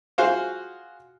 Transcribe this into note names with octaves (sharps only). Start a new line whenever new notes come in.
F4 F#4 G#4 C5 F5